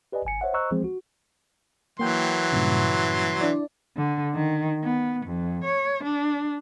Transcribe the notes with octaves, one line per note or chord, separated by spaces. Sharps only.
G4 B4 D5 D#5 G#5
G#1 G#5 C#7
C5 C#5 E5 F#5
C5 D#5 A#5 C#6 E6 F#6
E3 F3 G#3 C4 G#4 C5
F#4
E3 F#3 A#3 G5 C6 G6
G2 A#2 C#3
D4 E4 D5
D3
D#3
B3
F2
C#5
D4